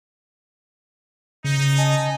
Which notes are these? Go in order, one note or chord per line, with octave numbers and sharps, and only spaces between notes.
C#3 D#4
D#5 G#5 A5